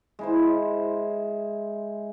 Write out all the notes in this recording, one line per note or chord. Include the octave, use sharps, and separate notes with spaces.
G#3 E4 C5